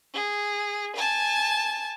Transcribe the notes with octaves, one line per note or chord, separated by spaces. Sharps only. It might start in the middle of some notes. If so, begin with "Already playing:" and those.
G#4
G#5 A5